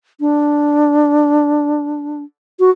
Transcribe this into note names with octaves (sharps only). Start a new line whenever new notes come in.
D4
F#4